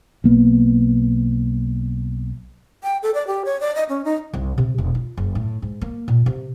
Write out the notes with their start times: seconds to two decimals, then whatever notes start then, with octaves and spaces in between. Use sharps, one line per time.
0.24 B1 A#3 B3
2.83 G5
3.03 A4
3.14 D5
3.27 G4
3.45 C#5
3.61 D5
3.75 D#5
3.89 C#4
4.05 D#4
4.33 C2
4.58 C3
4.78 E1
4.95 F4
5.17 F#1
5.35 A2
5.62 G#2
5.81 A#3
6.08 A#2
6.26 C3